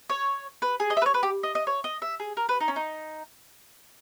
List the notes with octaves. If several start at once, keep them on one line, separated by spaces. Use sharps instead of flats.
C#5
B4
G#4
D#5
E5
B4
C#5
B4
G4
D#5
D#5
C#5
D#5
E5
G#4
A#4
B4
D#4
C#4
D#4